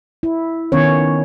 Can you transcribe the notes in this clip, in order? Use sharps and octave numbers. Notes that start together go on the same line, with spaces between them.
E4
D#3 B3 C#4 C#5